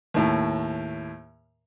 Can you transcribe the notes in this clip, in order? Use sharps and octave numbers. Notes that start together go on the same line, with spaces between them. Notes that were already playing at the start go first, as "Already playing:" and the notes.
D#2 A2